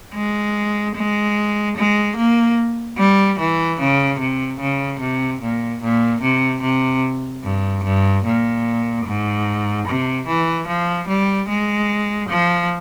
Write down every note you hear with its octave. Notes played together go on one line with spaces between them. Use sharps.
G#3
G#3
G#3
A#3
G3
E3
C#3
C3
C#3
C3
A#2
A#2
C3
C3
G2
G2
A#2
G#2
C3
E3
F3
G3
G#3
F3